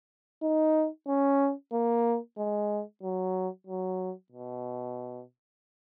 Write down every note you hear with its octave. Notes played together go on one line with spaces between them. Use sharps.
D#4
C#4
A#3
G#3
F#3
F#3
B2